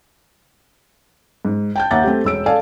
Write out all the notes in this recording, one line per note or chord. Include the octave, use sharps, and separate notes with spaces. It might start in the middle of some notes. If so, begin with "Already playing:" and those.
G#2
G5 A5 G6
D#2 E5 F#5 A#5 D6 A6
A3 C4 G4
E1 E6 D7
A4 D5 F5 G#5 A5